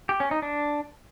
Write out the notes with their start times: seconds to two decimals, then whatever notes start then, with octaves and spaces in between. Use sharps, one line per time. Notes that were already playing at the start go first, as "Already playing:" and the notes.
0.09 G4
0.20 C#4
0.31 D#4
0.42 D4